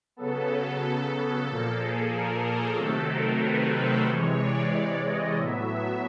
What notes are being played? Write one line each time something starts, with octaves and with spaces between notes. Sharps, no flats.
C#3 F#3 B3 A4
A4
A4
A#2 F3 A#3
G#4
A#4
A4
C3 D#3 F#3 A3 C4
A#4
B4
C5
C3 E3 G#3 C#5
D5
D#5
A2 F#3 B3 E5